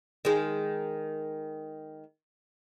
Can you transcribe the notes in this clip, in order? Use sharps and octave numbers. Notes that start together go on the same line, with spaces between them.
D#3 G#3